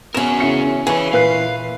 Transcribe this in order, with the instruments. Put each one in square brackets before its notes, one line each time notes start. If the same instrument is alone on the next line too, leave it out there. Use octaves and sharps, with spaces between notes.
[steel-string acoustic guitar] E2 C#4 [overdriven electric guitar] F#4 A#4 [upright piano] E7
[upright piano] C#3 E4 C#7
[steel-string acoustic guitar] E3 [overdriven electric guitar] G#4 C#5 [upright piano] G#5
[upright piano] A#2 B4 C7 [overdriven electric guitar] F5